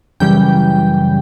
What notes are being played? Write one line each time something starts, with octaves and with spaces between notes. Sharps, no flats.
F#2 C#3 E3 G3 G5